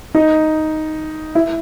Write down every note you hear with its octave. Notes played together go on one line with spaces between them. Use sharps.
D#4
E4